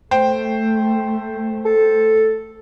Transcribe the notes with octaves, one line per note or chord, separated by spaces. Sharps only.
A3 C5 G5
A4